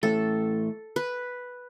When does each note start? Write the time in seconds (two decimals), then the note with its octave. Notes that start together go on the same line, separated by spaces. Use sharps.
0.03 A2 E3 A3 A4
0.96 B4